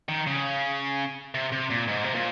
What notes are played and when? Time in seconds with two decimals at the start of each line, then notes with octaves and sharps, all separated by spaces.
0.09 D#3
0.27 C#3
1.34 C3
1.52 C3
1.70 A#2
1.88 G#2
2.04 C3
2.15 A#2